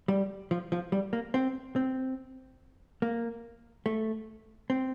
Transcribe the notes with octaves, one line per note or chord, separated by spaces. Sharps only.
G3
F3
F3
G3
A#3
C4
C4
A#3
A3
C4